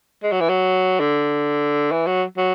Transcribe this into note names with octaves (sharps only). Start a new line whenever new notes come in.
G#3
F#3
E3
F#3
D3
E3
F#3
F#3